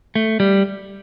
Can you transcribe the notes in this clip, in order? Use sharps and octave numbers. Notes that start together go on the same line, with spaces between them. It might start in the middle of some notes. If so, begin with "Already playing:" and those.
A3
G3